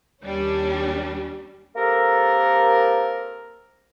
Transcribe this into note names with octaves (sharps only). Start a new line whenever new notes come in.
D#2 G3 C#4 D4
A#3 C4 G4 A4 A#4